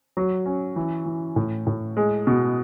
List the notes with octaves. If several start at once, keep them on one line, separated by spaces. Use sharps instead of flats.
F#3
C#4
E3
E3
A2
A2
G#3
B2